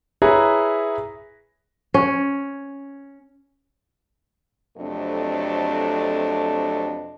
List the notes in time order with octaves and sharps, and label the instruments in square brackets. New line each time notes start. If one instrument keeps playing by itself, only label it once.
[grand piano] E4 G#4 B4 C#5 A#5
[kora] C#4
[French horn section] F2 C3 F#3 A3 D4